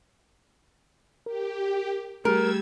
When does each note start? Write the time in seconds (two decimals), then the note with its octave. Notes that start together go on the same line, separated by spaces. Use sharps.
1.26 G4 A#4
2.25 G3 A3 G#4 A#4 E6 G#6